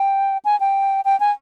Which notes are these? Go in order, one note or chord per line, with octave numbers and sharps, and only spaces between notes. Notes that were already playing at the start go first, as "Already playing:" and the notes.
Already playing: G5
G#5
G5
G5
G#5